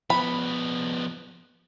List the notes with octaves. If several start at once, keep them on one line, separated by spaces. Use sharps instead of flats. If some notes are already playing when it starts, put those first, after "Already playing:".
F3 B3 B5